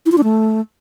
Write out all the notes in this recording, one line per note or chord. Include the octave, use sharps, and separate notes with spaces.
E4
F4
D4
A3